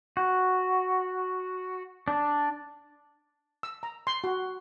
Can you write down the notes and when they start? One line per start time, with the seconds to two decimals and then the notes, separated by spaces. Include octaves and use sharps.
0.17 F#4
2.08 D4
3.63 E6
3.83 A#5
4.07 C6
4.24 F#4